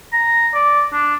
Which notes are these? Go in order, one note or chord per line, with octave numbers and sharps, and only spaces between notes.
A#5
D5
D4